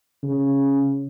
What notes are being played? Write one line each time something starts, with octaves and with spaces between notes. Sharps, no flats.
C#3